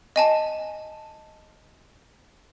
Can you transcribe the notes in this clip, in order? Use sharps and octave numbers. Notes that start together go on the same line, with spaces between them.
D#5 G#5 A5